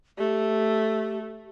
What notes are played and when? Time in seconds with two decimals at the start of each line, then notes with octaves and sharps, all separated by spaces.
0.18 A3 G4